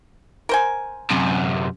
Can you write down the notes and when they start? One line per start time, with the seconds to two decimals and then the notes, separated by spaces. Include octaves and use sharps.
0.49 A#4 C5 G#5
1.11 F#2 C3